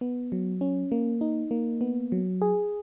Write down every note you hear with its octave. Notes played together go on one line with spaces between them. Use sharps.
B3
F#3
C#4
A#3
D#4
A#3
B3
F#3
G#4